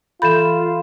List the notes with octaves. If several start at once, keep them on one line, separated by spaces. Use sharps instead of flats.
E3 F4 A4 B5 G6 E7